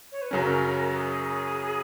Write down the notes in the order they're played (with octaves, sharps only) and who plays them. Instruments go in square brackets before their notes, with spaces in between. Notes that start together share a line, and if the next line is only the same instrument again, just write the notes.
[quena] C#5
B4
[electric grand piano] F#2 C#3 F#3 C#4 [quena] A#4
[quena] G#4